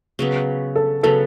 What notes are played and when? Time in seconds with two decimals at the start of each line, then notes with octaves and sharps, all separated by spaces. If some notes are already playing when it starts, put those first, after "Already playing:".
0.19 C#3 F#3 B3
0.76 A4
1.03 C#3 F#3 B3 A4